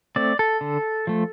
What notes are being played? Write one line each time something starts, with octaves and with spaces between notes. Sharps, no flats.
A3 C4 D5
A4
D3
F3 A3